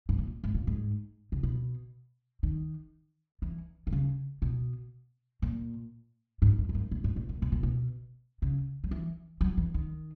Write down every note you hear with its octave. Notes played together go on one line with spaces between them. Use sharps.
G#2
A#2
G#2
A#2
G#2
C#3
B2
D#3
E3
D#3
C#3
B2
A#2
G#2
F#2
F#2
G#2
A#2
G#2
A#2
A#2
B2
A#2
B2
C#3
F#3
E3
F#3
E3
D#3